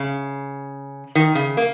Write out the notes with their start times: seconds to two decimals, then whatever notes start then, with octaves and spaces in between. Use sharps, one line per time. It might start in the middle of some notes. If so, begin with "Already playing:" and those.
Already playing: C#3
1.15 D#3
1.35 C#3
1.57 A#3